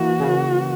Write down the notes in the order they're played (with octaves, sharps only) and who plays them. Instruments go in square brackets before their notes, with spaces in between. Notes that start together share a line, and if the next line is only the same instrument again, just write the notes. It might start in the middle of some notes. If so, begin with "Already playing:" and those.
Already playing: [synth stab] E3 A#3 [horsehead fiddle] F#4
[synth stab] C#3